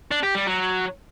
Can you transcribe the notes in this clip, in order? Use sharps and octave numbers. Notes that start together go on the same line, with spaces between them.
D4
G4
G3
F#3